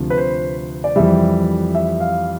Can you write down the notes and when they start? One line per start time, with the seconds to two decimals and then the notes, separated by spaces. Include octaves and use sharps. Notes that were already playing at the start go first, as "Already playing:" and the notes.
Already playing: D2 C3 F3
0.10 B4
0.18 C5
0.84 D5
0.96 F2 E3 G3 E5
1.75 E5
2.00 F5